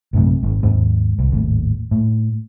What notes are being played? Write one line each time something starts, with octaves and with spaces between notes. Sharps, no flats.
A#1 F#2 C3 A3
G#1 G#2
D#2 G#2 G#3
C2
G#1 D#2 A2
A2